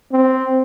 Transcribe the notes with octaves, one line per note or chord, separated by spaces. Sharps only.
C4